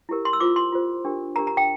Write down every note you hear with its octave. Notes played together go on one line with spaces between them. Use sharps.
E4 G4 A#4
C6
E6
F4 C5 D6
C6
F4 C5
D4 G4 A#4
D4 G4 A#4 A#5
A#5
G5